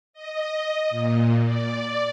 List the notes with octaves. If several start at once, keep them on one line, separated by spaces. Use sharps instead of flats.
D#5
A#2
D5